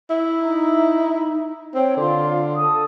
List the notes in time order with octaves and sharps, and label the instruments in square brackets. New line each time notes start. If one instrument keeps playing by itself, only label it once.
[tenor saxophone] E4
[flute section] D#4
[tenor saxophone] C4 [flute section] C#5 G5
[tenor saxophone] D3 [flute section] F4 C6
[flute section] A4 D#6